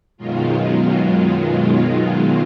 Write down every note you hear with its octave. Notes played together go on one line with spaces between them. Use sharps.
F#2 B2 D#3 F#3 G#3 F4